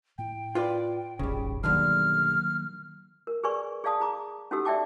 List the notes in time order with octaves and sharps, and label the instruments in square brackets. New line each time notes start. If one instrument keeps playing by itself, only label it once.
[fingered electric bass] A2 [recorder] G5
[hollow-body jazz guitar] F4 B4 D5
[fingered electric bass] D#1 G#1 [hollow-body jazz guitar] C#3 G3
[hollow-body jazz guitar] B1 D3 G3 [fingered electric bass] D#3 F#3 A#3 [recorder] F6
[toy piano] A#4
G#4 A#4 B4 D5 G#5 C#6
G#4 D5 F5 A5 D#6
G#4 A#5 D6
C#4 D#4 F#4 G4 A4 E6
D5 E5 G5 A5 D6